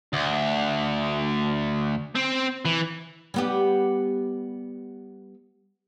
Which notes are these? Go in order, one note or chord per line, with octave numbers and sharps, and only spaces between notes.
D2
C4
E3
G3 B3 G4